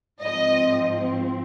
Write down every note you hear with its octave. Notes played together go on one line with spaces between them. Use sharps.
G#2 F3 C4 D#5